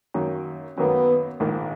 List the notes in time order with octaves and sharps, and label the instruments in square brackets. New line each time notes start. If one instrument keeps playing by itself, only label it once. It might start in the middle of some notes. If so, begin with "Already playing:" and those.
[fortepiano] F#2 D#3 A#3
[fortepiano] F#2 D#3 A#3 [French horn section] B3
[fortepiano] A#1 G#2 D#3 A#3